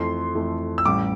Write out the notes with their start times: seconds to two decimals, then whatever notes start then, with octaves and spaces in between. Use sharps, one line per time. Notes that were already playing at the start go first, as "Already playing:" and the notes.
Already playing: F2 E3 A3 C6
0.35 F2 E3 A3
0.78 E6
0.86 A1 A2 G3 D6